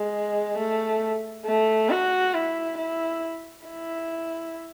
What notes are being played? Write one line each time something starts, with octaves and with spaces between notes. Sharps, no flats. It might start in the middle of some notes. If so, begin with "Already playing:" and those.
Already playing: G#3
A3
A3
F#4
E4
E4
E4